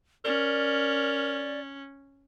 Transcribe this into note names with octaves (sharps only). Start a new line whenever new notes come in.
C#4 A#4 D5